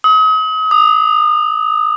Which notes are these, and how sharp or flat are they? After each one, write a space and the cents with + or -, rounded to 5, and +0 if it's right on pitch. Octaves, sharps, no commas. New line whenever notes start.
D#6 +40
D#6 -35